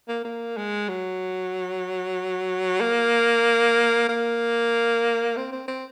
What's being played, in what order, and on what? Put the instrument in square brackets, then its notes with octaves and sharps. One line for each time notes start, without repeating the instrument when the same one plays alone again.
[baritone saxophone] A#3
A#3
G#3
F#3
A#3
A#3
C4
C4
C4